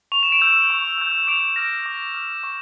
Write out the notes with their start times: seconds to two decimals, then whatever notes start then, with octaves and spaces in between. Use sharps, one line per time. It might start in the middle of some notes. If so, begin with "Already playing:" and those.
0.12 C#6 F7
0.23 E7
0.32 D7 F7
0.41 E6 G6
0.70 C#6
0.98 E6 G6
1.27 D6 D7 F7
1.56 F6 A#6 D7
1.86 D6
2.15 F6
2.43 C#6